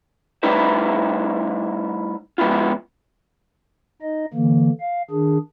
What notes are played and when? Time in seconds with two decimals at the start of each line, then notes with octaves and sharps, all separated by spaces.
0.43 G3 A3 D#4 E4 B4 C5
2.38 F3 G#3 B3 E4 F4
4.02 D#4 D#5
4.34 D3 E3 A#3
4.80 F5
5.11 D#3 D4 G#4